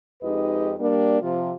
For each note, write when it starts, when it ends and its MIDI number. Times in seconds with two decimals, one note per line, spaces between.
0.23 0.74 41
0.23 0.74 56
0.23 0.74 63
0.23 0.74 67
0.23 0.74 71
0.23 0.74 75
0.80 1.18 55
0.80 1.18 58
0.80 1.18 62
1.21 1.53 48
1.21 1.53 53
1.21 1.53 65